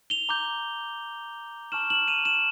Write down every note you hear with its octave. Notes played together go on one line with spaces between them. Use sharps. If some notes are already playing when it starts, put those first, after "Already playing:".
F7 G7
A#5 D6 G6
A5 C#6 F6 E7 F#7
E7 F#7
D#7 F7
E7 F#7